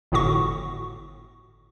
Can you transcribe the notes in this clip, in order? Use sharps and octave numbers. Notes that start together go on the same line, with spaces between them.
G1 A2 D3 F#4 C#6